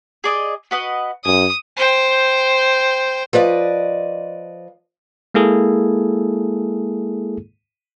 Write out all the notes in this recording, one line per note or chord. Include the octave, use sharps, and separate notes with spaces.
G#4 D5 D#5
F#4 B4 D#5
F#2 G#5 D#6
C5 G5
F3 B4 D5 D#5
G#3 A#3 E4 G#4 A4